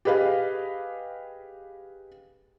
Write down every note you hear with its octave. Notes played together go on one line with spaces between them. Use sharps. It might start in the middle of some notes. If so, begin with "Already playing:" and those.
G4 G#4 B4 D#5 F5